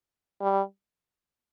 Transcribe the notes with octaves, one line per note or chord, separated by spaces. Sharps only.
G3